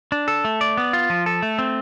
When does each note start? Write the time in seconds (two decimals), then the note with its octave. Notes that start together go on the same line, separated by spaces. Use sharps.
0.12 D4
0.28 A4
0.45 A3
0.61 D5
0.77 B3
0.93 F4
1.10 F3
1.26 A4
1.42 A3
1.59 C4